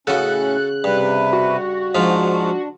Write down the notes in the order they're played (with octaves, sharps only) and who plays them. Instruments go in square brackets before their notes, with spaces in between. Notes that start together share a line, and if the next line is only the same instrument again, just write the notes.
[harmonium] A2 C#4 [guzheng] C#3 B3 D#5 [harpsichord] F#4 A4 [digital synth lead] F#6
[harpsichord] G2 [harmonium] C3 B4
[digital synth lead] F#4
[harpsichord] G#2 F3 F4 [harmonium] D4